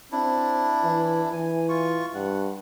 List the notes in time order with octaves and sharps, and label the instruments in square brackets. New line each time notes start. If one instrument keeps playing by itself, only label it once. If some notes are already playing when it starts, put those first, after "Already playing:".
[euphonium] C4 [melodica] D4 E4
[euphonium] E3
[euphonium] E3 [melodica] G#5
[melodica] F4 C#6
[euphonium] G2 [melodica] F#5